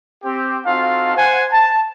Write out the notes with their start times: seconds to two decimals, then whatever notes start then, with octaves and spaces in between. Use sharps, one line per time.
0.24 C4 G4
0.65 C4 D#4 F4 F#4 A4 F5
1.15 C5 F#5 G#5
1.52 A5